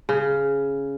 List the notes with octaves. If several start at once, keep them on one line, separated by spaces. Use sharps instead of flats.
C#3